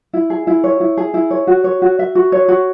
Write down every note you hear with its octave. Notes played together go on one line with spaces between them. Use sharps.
E4
G#4
E4
C#5
E4
G#4
E4
C#5
F#4
C#5
F#4
E5
F#4
C#5
F#4